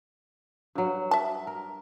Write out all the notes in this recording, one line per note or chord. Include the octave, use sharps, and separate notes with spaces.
G2 F#3
E5 A5
A#4